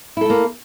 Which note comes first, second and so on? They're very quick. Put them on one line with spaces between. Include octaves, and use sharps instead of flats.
E4 A4 A3 A#3